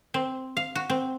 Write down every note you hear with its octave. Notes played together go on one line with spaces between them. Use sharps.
C4
F5
F#4
C4